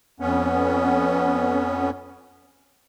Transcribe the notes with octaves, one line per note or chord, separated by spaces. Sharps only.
F2 B3 C#4